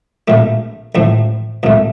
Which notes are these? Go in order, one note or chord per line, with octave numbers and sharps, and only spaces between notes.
A#1 A#2 A3
A1 A2 F3 A3
C2 A#2 A3